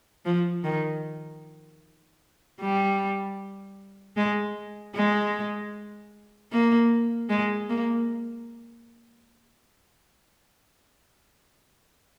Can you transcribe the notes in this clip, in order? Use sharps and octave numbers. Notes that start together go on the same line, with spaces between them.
F3
D#3
G3
G#3
G#3
A#3
G#3
A#3